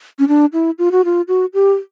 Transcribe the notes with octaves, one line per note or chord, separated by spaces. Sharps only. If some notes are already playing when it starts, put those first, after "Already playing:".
C#4
D4
E4
F4
F#4
F4
F#4
G4